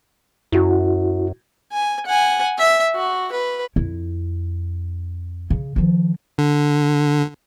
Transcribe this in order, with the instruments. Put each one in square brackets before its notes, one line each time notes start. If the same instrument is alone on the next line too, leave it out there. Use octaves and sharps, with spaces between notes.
[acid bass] F#2 [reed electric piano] E4 F#4
[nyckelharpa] G#5
F#5 G#5
E5
F#4
B4
[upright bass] F2 E4
C#3
D#3 F3
[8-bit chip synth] D3